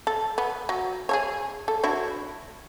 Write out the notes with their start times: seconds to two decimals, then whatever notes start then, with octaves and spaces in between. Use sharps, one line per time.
0.07 A4
0.38 B3
0.69 F#3
1.09 G#4 A4 C#5
1.68 A4
1.84 D4 E4 F#4